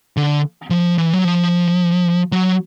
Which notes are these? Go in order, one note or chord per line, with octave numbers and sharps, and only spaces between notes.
D3
F3
E3
F#3
F3
F#3